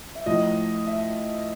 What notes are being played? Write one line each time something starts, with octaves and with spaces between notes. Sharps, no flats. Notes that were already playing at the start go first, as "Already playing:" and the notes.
E5
A2 F3 D#5
E5